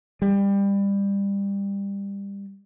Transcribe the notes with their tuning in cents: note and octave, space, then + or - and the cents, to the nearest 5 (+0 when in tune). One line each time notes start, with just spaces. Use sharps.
G3 +25